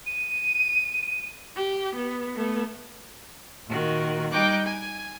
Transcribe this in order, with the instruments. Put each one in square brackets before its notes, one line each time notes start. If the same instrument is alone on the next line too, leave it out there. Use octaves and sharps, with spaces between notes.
[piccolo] D#7
[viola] G4
B3
A3 B3
[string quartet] A#2 D#3 F#4
G3 D#4 G5 D6 F#6
G#5